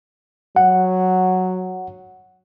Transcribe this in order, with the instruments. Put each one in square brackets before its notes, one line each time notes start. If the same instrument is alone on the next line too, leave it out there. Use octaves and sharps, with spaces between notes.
[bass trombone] F#3 [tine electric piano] F#5